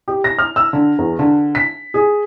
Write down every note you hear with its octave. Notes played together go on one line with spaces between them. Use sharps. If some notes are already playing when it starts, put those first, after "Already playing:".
G4
A#6
F6
E6
D3
E2
D3
B6
G#4